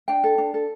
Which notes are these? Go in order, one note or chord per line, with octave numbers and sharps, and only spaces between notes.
D4 G5
A4
D4
A4